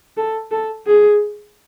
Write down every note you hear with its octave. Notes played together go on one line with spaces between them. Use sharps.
A4
A4
G#4